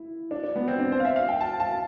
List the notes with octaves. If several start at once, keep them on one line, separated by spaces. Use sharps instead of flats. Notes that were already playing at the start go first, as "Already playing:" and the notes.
Already playing: E4
D4
D4
B3
C4
D4
C5
F5
E5
F5
G5
A5
A5